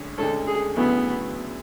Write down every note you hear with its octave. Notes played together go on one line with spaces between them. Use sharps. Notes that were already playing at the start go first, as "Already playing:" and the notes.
Already playing: D2 D3 G#3 C#4
D2 D3 G#3 C#4 A4
G#4
D2 C#3 F#3 A3 B3 E4